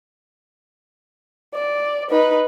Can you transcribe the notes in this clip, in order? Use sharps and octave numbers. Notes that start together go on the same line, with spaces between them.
D5
D#4 B4